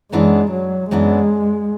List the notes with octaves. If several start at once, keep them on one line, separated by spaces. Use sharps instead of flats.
F#2 E3 G#3 B3 D4
F#3
F#2 E3 G#3 B3 D4